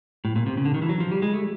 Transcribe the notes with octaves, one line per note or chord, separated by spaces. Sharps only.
A2
A#2
C3
C#3
D3
D#3
E3
F#3
F3
G3
G#3
A3